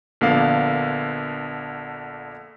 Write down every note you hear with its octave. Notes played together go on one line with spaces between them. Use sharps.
A#1 D3 A#3 B3 F5